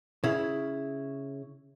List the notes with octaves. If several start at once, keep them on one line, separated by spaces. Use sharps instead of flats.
C#3 E4